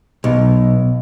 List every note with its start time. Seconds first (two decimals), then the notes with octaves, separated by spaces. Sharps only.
0.24 B1